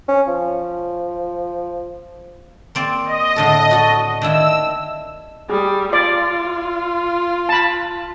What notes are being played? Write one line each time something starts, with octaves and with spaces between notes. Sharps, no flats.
C#4
F3
A#3 C4 D5
D#5
A2 D3 A4
F#4 A4
D#3 D4 E4 E6
G3 G#4
F4 D5
A5 B5